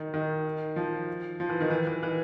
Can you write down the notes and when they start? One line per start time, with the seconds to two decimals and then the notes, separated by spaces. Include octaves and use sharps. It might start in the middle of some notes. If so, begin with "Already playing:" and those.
Already playing: D#3
0.14 D#3
0.76 F3
1.40 F3
1.49 E3
1.60 D#3
1.70 E3
1.87 E3
2.03 E3